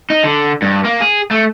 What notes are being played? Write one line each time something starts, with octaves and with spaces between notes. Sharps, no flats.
D#4
D3
G2
A#3
G#4
A3